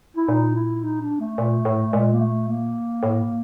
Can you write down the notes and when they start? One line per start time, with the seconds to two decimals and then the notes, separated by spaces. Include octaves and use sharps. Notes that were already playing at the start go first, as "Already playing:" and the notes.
0.17 E4
0.28 A#2 D#4
0.55 E4
0.83 D#4
1.02 D4
1.19 A3
1.38 A#2
1.65 A2
1.93 A#2 G#3
2.14 A#3
2.20 A3
2.48 A#3
3.03 A2